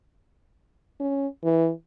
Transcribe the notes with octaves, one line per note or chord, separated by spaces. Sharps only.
C#4
E3